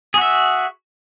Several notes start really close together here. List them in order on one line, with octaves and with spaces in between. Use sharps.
G#4 F#4 E5